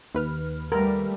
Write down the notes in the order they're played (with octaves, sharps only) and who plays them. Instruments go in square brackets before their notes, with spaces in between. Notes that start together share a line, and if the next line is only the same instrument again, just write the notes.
[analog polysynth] D#2 B4 F6
[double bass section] G3 A3 [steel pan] A#4